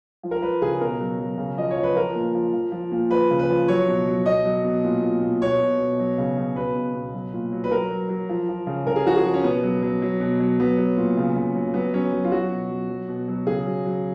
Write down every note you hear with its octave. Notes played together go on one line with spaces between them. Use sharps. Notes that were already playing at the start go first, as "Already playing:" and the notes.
F3
A#4
F3 B4
C#3 G#4
B2 A#4
F#3
F#3
C#3
F3 D#5
C#5
F3
B4
F3 A#4
A#2
F3
F3
F3
A#2
F3 B4
C#3
B4
F3
F#3 C#5
B2
F#3
B2 D#5
F#3
B2
A#2
A#2
A#2
B2 C#5
B2
B2
F#3
C#3
C#3
B2 B4
B2
B2
F#3
A#2
F#3
B4
F#3 A#4
F#3
F#3
F3
F3
C#3
C#3 A#4
G#4
F3 F#4
G#4
F3
C#4
B2 B3
F#3
F#3
F#3
B2
F#3
F#3 B3
F#3
A#2
C#3
C#3
F#3
F#3 B3
F#3 C#4
F#3
F4
F#3 F#4
B2
F#3
F#3
B2
F#3
C#3 G#4
F#3
F#3